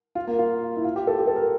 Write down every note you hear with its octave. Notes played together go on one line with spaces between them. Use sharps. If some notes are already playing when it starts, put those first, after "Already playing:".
F4
A#3
F4
E4
F4
G4
A4
G4
A4
A#4